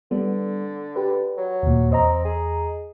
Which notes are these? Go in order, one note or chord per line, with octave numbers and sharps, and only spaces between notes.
D3 G3 B3
G4 B4
F#3
D#2 A#2
E2 C4 D#5 A#5
G#4